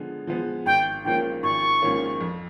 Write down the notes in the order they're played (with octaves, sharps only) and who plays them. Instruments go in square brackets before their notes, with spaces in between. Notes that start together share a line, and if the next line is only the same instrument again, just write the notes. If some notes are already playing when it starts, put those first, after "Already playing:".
Already playing: [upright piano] D3 F3 G#3 B3
F3 G#3 B3
[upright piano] G#1 [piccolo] G5
[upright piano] G#2 F3 A#3 C#4 [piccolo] G5
[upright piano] G#1 [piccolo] C#6
[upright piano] G#2 F3 A#3 C#4
F2